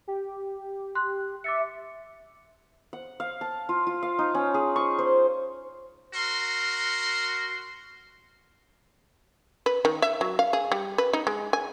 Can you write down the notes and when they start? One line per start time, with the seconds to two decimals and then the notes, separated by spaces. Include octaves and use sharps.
0.07 G4
0.95 C6 F#6
1.44 E5 D6 A6 C#7
2.93 F#5
3.20 F5
3.41 A5
3.69 F4
3.87 F4
4.03 F5
4.19 D#4
4.35 C#4
4.54 G#4
4.76 C#6
4.99 C5
6.14 F#4 A#4 C6
9.66 B4
9.85 D#3
10.02 E5
10.21 F#3
10.39 F5
10.53 G#4
10.72 G3
10.98 B4
11.13 D#4
11.27 G#3
11.53 G#5